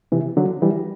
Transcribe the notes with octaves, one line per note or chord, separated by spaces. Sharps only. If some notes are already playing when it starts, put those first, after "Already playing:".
C3 E3
D3 F#3
E3 G3